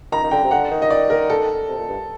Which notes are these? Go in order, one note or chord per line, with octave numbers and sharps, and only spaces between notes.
D#3 A#5
D#3
D3 G5
C3
D3 F#5
D#3
D#5
D5
A#4
A4
C3
A#2
G2